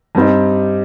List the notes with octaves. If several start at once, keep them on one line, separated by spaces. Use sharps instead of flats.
G2 G3 C4 D#4